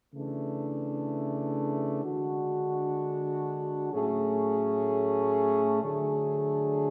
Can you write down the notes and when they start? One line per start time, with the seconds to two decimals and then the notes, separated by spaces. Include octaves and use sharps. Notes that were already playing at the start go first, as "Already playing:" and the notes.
0.12 C#3 E3 A3 D4
2.02 D3 G#3 D4 F#4
3.92 A2 F#3 A3 C#4 G#4
5.81 D3 F#3 A3 D4 G#4